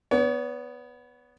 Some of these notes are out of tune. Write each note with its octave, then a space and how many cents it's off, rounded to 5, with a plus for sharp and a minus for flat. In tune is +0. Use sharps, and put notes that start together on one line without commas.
B3 +0 C#5 +40